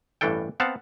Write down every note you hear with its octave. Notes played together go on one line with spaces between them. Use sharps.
A1 G2 E3 D4 A4 G5
B3 C4 F5 F#5 A5